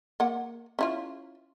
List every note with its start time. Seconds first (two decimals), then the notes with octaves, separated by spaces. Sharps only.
0.20 A#3 F#5
0.79 C#4 E4 F4